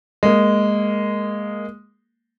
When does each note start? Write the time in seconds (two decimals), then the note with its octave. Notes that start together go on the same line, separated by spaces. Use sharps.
0.23 G#3 A#3